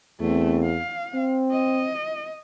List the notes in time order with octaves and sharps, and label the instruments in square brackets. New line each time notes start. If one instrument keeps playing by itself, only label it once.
[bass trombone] E2 [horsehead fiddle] A3 C4
[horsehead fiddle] F5
[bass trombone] C4
[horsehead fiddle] D#5